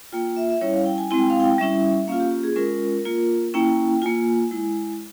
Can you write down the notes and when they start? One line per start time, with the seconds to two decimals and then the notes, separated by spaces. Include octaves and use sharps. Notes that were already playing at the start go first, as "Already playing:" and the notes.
0.13 A#3 F4 G5
0.37 E5
0.50 E5
0.61 G3 C#4 E4 C#5
0.74 F5
0.86 G5
0.98 G#5
1.10 G#3 C4 E4 G#5
1.19 G5
1.30 F5
1.40 G5
1.58 G3 C#4 E4 E5
2.08 A#3 C#4 F4 F5
2.20 G4
2.31 G4
2.43 G#4
2.56 G#3 C#4 F4 A#4
3.05 A#3 F4
3.54 A#3 C#4 E4 G5
4.02 A#3 F4 G#5
4.51 G#3 E4